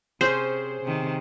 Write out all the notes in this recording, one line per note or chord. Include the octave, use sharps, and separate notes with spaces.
C3 C#4 G#4 C5
C3 D#3